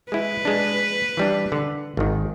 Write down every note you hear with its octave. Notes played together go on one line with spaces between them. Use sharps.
G#3 E4 B4
G#3 D4
E3 G3 D4
D3
G#1 D#3